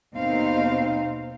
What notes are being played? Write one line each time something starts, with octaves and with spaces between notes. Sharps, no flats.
D#2 B2 C4 D#4 C5 F5